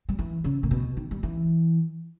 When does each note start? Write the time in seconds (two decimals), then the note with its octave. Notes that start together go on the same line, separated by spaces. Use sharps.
0.09 G3
0.19 E3
0.44 C#3
0.63 A#2
0.71 B2
0.97 D#3
1.11 G3
1.23 E3